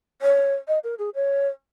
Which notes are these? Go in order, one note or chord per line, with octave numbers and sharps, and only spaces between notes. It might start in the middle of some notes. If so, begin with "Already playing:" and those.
C#5
D#5
A#4
G#4
C#5